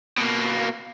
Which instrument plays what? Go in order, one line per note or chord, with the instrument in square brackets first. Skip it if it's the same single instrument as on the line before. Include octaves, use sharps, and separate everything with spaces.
[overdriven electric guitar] B2 A#3